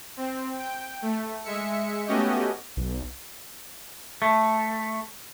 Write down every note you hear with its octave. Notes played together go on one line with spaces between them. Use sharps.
C4
G5
A3
G#3 E5 C#7
A3 B3 C#4 F#4 G4 D#5
B1
A3